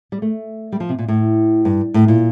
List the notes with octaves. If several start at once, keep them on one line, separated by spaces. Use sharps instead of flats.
G3
A3
G3
F3
C3
A#2
A2
G2
A2
A#2